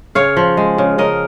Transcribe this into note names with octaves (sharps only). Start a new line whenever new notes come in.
C#3 C#5 F5
F3
G#3
C#3
C#3 A#4 D#5